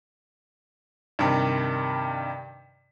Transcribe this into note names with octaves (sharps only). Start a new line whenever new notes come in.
G2 C3 D#3